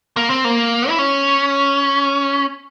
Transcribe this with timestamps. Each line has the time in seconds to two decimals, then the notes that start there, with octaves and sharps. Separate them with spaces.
0.17 A#3
0.30 C4
0.45 A#3
0.89 E4
0.99 C#4